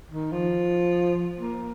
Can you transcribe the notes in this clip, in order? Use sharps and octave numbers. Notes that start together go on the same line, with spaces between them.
D#3
F3
A#3